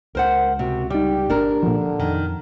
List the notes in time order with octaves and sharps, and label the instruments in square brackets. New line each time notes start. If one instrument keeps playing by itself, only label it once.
[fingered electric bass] C#2 [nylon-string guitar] A#4 C5 F#5
[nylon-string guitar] C3 [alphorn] F#4
[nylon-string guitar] G3 [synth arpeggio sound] D#4 D5 [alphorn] G4
[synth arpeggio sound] G1 [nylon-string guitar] D4 A#4
[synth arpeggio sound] A#2 F3 [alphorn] D3
[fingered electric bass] F2 [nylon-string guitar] D#3